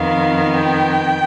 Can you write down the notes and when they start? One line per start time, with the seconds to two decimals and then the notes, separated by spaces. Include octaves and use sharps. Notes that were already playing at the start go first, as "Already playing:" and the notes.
Already playing: F2 D#3 B3 F5
0.54 G5